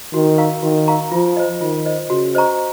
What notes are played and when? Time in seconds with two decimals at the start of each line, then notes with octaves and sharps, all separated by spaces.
0.14 D#3 F#4
0.38 A#4 F5 A#5 C#6
0.63 D#3 F#4
0.88 A#4 F5 A#5 C#6
1.12 F3 F4
1.37 C5 D#5
1.61 D#3 F4
1.86 C5 D#5
2.10 C#3 F#4
2.35 C5 D#5 A#5 C#6